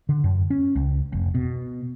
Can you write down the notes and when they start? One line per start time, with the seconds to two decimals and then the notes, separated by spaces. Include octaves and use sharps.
0.09 D3
0.24 F#2
0.50 C#4
0.76 C#2
1.13 F1
1.35 B2